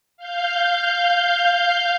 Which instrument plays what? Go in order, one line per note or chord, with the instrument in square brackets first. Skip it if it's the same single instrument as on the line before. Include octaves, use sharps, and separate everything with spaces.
[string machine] F5 G6